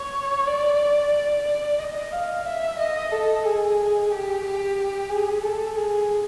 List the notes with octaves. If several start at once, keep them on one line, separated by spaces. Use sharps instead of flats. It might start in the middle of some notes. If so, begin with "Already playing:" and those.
Already playing: C#5
D5
D5
D#5
F5
E5
D#5
A4
G#4
G4
G4
G#4
A4
G#4